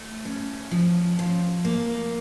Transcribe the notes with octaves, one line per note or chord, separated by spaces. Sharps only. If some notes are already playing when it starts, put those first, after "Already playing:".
Already playing: A3
C#4
F3
F3
A#3